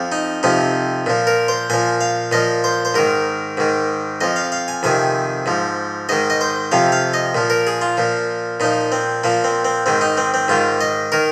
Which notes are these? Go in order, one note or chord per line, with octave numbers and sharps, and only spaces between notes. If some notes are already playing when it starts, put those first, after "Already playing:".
Already playing: F2 F3
D#4
F2 C3 F3 D#4
A#2 F3
A#4
C5
A#2 F3 G#5
F5
A#2 F3 D#5
C5
C5
G#2 D#3 A#4
G#2 D#3
F2 F3 D#5
F5
F5
G#5
F2 C3 D#3 G#5
G#2 F3
G#2 D#3 D#5
D#5
C5
F2 C3 F3 F5
F5
D#5
A#2 F3
A#4
G#4
F4
A#2 F3
A#2 F3 D#4
C4
A#2 F3 A#3
C4
C4
G#2 D#3 C4
D#4
C4
C4
G#2 D#3 F4
D#5
D#3 A#4